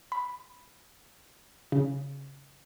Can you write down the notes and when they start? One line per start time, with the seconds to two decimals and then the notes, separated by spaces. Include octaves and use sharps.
0.12 B5
1.72 C#3